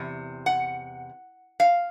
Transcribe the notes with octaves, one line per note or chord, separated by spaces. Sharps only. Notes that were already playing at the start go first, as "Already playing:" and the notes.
Already playing: E2 C3
F#5
F5